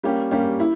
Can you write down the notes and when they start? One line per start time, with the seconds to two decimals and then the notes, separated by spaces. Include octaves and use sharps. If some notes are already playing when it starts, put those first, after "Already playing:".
0.03 G3 A#3 C#4 G4
0.31 G3 A#3 C#4 G4
0.60 E4